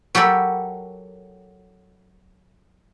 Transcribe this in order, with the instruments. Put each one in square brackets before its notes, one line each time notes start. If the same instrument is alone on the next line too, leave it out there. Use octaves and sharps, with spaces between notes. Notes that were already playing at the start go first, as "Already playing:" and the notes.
[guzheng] F#3 G4 A4 A#4 B5